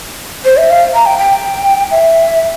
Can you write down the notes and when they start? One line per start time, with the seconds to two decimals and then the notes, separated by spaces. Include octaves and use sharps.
0.45 C5
0.57 E5
0.70 F5
0.94 A#5
1.06 G5
1.19 G5
1.91 E5